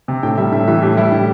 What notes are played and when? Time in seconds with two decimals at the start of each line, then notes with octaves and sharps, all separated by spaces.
0.08 C3
0.23 A2 G5
0.37 G3 E5
0.52 A2 E5
0.67 E3 E5
0.83 A2 G4
0.97 G3 E4
1.12 A2 G4